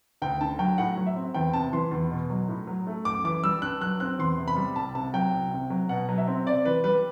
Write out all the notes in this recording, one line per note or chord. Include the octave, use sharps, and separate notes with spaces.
D2 G5
D3 A5
F#3 G5
A2 F#5
F#3
E5
C4
E2 G5
C3 A5
E3 C6
E2
B2
F#3
A2
F#3
A3
F#2 D6
E3 D6
G3 E6
G2 F#6
F#3 F#6
C4 F#6
E2 C6
C3
B5
G3
C2 A5
C3 A5
F#3 G5
C2
C3
F#3
B2 F#5
F#3
E5
C4
C3 D5
E3 B4
G3 B4